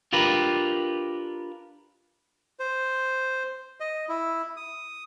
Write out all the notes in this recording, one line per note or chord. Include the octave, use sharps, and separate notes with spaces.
D4 F4 G4 A#4 B4
C5
D#5
E4
D#6